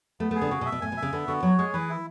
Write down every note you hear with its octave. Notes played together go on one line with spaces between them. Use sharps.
A3 B3
A3
G#4
D3
C#3 F#4
B2
E5
B2
A2 G#5
B2
E5
C#3
D3 B3
D3 F#4
F#3 C#5
G#3 G#4
E3 B4
E4